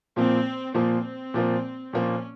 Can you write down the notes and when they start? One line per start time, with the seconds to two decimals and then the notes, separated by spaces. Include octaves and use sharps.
0.16 A#2 F3 A#3 C4
0.74 A#2 F3 A#3 C4
1.34 A#2 F3 A#3
1.93 A#2 F3 A#3 C#4